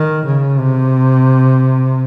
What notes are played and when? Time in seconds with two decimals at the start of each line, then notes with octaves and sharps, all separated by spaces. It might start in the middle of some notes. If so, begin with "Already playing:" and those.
Already playing: D#3
0.25 C#3
0.59 C3